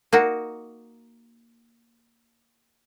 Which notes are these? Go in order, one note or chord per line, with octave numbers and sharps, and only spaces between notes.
A#3 D#4 F#4